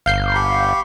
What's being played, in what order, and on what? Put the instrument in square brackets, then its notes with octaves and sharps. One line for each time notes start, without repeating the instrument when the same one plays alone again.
[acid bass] G1 [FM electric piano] F5 G6 C7
[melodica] G4 B5 C#6